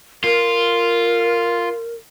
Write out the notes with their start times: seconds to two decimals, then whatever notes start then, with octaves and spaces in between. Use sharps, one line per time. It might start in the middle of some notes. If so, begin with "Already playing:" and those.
0.24 F4 A#4